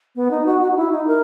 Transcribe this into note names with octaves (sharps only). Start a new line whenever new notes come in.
B3
D#4
F#4
F#4
D#4
E4
D#4
A#4